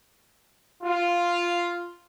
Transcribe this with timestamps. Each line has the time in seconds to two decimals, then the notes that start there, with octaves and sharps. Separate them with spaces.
0.84 F4